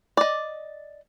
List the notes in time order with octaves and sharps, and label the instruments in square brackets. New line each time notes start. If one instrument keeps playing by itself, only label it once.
[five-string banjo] D5 D#5